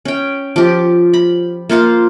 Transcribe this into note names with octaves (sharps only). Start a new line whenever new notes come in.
C#4 G5
F3 G4
B5
A#3 F4 C5 F5